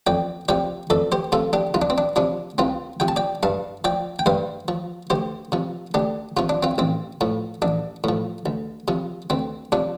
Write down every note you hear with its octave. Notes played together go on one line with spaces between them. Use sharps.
F2 D5 G5
C3 F3 D5 G5
F2 A4 D5
G4 C5
C3 F3 F4 A4
D4 G4
C2 F4
D4
C4
D4
C3 F3 D4
C2 C4 F4
C3 F3 G5
A5
D5 G5
G2 F5 A5
F3 D5 G5
G5
G2 C5 F5
F3
D2 G4 C5
C3 F3
D2 D4 G4
C3 F3 F4
D4
C4 F4
A1 C4
A2 F3
A1 D4
A2 F3
D2
C3 F3
D2 C4
C3 F3 D4